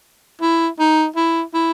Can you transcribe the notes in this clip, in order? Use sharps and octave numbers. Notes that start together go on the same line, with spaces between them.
E4
D#4
E4
E4